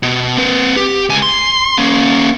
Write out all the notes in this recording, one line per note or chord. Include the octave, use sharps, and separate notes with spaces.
B2
C4 B4
G4
C#2 G#5
C6
A#3 C#4